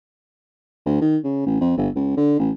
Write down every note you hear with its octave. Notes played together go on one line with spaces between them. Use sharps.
D2
D#3
C#3
A1
F2
G1
C#2
D3
A1